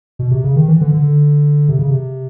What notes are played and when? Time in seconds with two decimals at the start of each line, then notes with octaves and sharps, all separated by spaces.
0.19 B2
0.31 C3
0.44 C#3
0.56 D#3
0.68 E3
0.81 D3
0.94 D3
1.69 C3
1.79 C#3
1.91 C3